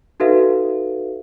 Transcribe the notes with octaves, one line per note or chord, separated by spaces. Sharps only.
D#4 F#4 A4 B4 E5 F5